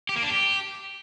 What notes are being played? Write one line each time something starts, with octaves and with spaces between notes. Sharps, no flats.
G4
A#3
D4
G4